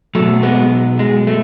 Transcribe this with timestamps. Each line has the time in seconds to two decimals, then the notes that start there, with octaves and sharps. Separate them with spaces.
0.15 B2 F#3 A3
0.43 G#3 B3
0.99 G#3
1.27 A3